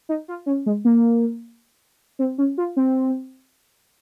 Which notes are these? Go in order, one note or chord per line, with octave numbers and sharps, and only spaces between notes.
D#4
F4
C#4
G#3
A#3
C4
C#4
F4
C4